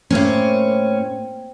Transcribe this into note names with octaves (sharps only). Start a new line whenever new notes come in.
A2 A#3 C4 C#4